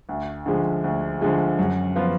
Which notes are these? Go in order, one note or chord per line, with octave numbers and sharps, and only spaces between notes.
D2
D3 F3 G#3
D2
D3 F3 G#3
F#2
F3 B3 F4